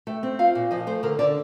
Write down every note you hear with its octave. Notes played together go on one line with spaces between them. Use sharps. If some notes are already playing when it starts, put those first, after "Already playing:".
A3 G5
C4
F4 F5
A#2
F3 D#5
A3 C5
D3 A#4
D3 D5